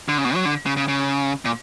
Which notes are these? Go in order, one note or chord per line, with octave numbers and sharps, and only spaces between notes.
D3
C#3
B2
F#3
D3
C#3
C#3
C#3
A#2